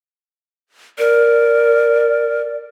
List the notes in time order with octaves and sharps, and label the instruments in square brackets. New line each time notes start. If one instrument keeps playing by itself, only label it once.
[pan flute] A#4 [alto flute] D5